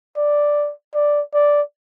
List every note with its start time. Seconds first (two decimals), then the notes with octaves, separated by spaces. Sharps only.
0.17 D5
0.94 D5
1.34 D5